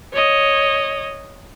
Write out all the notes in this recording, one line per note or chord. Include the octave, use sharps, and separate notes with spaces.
C#5 D#5